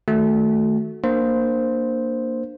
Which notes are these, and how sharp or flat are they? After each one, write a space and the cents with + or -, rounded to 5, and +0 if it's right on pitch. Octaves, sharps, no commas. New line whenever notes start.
D#3 +5 A3 -10 F#4 +0
A#3 +0 D4 +15 C5 +0